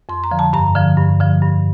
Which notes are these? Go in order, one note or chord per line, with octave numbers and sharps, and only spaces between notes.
F2 C6
A#5
D3 F3
A5
G2 A#5
D3 F3
G2
D3 F3
G2